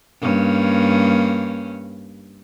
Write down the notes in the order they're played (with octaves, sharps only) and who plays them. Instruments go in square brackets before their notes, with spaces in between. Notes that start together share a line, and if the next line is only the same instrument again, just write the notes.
[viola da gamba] G2 A#3 C#4